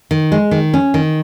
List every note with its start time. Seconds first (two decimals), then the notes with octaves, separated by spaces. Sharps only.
0.11 D#3
0.32 G#3
0.51 D#3
0.74 C#4
0.94 D#3